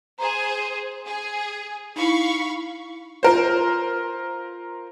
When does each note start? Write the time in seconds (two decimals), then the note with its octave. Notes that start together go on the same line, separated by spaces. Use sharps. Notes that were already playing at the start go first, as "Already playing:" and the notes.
0.19 G#4 C5 A#5
1.06 G#4
1.96 D#4 E4 F5 B5 C#6
3.23 F4 A#4 C5